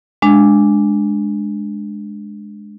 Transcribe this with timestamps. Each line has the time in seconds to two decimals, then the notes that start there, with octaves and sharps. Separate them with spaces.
0.22 G#3 D4